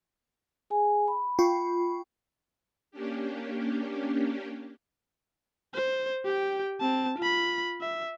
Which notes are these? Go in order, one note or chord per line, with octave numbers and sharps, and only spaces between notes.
G#4 G#5
B5
F4 G5 C#6
A#3 C#4 D4 G4
C5
G4 G5
C4 A5
F4 B5
E5